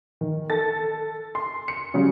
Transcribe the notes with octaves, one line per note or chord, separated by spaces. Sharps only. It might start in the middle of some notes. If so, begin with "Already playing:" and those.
D#3
A4 A6
C6
C#7
C#3 F#3 G3